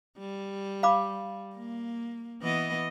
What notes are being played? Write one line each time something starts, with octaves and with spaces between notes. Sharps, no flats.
G3
F5 B5 D6
A#3
E3 B3 D#5